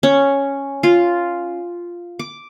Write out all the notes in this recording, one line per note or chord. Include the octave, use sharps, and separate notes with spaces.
C#4
F4
D6